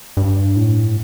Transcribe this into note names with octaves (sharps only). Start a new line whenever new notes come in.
G2
A2